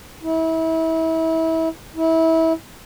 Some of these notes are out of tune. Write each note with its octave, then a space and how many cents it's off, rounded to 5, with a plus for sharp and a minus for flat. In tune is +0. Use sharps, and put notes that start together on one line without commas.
E4 -30
E4 -25